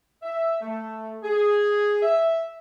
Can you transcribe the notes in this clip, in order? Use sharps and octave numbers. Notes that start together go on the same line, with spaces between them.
E5
A3
G#4
E5